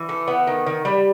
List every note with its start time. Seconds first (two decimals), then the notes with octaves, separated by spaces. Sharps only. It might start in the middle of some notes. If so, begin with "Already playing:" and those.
Already playing: E3
0.09 A3
0.28 B3
0.47 D#3
0.66 D#3
0.85 G3